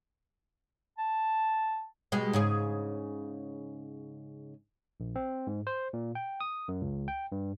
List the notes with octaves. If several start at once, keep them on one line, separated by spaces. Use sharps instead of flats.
A5
B2 G3 G#3
G#2 C#3 G#4
A#1
C4
G#2
C5
A#2
G5
D#6
F#2
C#2
G5
G2